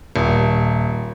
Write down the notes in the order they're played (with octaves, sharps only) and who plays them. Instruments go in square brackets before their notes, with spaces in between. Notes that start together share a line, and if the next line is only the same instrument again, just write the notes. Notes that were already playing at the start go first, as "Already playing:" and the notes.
[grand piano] D#1